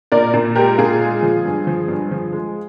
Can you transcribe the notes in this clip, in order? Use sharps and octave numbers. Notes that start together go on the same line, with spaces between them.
A#2 A#4 D5
A#2
G#3 G4 A#4
A#2 F4 G#4
G#3
F3
G2
F3
G2
F3
G#3